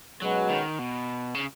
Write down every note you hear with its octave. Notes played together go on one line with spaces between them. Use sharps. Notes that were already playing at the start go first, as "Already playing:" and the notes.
B2 F#3 G#3 C#4 F#4 B4
D#3
B2
C#3